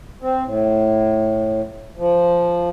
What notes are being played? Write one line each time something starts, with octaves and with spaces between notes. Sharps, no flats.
C4
A2
F3